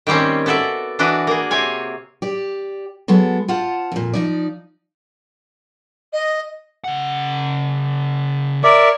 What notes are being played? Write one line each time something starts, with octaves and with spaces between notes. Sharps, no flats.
D#3 G3 A#3 C4 C#4
B3 F#4 A4 D5 E5
E3 D4 F#4 B4 D#5
A#3 G#4
C3 C4 C#5 G#5
G4 D5
F#3 G#3 B3 A4
F4 C5 F5 F#5 A5
F2 A#2
F3 D#4 D5
D#5
C#3 F#5
A#4 C#5 D5 E5 D6